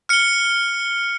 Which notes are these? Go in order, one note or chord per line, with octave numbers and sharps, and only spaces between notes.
F6 C#7 G7